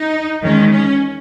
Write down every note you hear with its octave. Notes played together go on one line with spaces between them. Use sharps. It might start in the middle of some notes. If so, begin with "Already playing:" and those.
Already playing: D#4
E2 D#3 G#3 C#4
C#4